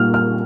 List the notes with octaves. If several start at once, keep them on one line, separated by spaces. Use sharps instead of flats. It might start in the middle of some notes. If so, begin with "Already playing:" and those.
Already playing: A#2 G3 A#3 F6
F6